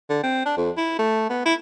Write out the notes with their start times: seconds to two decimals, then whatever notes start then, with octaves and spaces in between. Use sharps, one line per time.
0.10 D3
0.23 C4
0.46 D4
0.57 F2
0.77 E4
0.99 A3
1.30 B3
1.46 E4